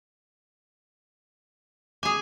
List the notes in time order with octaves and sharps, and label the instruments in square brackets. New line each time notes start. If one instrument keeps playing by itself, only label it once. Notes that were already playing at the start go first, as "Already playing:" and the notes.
[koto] G#4 G#5 [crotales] D6 D#6